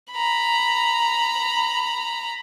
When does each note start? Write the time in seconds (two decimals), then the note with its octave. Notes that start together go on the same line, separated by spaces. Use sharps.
0.12 A#5 B5